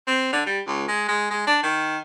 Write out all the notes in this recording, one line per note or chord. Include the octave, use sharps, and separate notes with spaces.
C4
D3
G3
C#2
G#3
G#3
G#3
D4
D#3